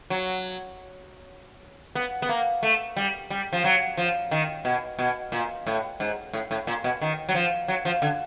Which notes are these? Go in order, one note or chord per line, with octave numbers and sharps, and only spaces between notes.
F#3
B3
B3
A#3
A3
G3
G3
F3
F#3
F3
D#3
B2
B2
A#2
A2
G#2
A2
A2
A#2
B2
D#3
F#3
F3
F#3
F3
D3